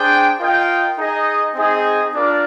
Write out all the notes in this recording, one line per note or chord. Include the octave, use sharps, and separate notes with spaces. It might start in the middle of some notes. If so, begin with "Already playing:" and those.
Already playing: D4 G#4 C5 G5
F4 A#4 D#5 G5
D#4 G#4 D#5
C4 D#4 G#4 D#5
D4 F4 A#4 D5